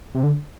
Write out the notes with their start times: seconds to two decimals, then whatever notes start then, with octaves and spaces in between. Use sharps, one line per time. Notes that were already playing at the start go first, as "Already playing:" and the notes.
0.15 C3
0.23 D3